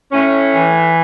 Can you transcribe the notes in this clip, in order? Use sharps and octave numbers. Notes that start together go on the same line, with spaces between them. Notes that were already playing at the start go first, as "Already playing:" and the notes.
A2 A3 C#4
E3